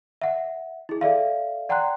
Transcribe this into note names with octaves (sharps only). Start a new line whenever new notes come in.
E5 F#5
E4 G#4
A4 D5 E5 F5
D5 F#5 G5 A#5 C6 F#6